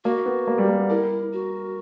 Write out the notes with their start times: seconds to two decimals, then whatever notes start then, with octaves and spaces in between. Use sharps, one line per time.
0.04 A#3 F#4
0.26 B3
0.47 A#3
0.58 G3
0.69 A#3
0.79 B3
0.90 E4 A#4
1.33 F#4